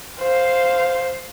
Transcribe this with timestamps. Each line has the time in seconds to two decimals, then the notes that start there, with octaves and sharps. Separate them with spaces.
0.20 C5 F5